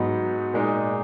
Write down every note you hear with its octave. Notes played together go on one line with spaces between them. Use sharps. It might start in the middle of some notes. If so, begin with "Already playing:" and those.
Already playing: G#2 F#3 B3 D#4 F#4
A#2 G#3 D#4